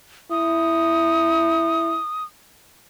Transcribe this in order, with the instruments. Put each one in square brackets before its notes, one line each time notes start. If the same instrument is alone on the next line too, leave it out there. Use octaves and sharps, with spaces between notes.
[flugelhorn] E4 [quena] D#6